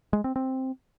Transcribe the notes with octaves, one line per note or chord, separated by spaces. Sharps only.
G#3
C4
C4